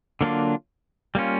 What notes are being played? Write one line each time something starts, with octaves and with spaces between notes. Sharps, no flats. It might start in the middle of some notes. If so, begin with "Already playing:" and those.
D3 F#3 A#3 D4 F4
G3 A#3 C#4 F4